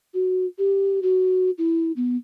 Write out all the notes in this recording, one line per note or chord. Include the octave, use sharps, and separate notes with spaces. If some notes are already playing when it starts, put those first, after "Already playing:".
F#4
G4
F#4
E4
B3